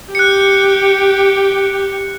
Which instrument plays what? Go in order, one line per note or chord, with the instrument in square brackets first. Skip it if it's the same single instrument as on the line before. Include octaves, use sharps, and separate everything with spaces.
[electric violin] G4 [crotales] F#6 C#7